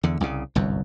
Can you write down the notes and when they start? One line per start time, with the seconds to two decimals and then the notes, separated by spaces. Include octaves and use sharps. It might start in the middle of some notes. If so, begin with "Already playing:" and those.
0.03 E2 D3
0.20 C2 C#3
0.55 G1 C2 F#2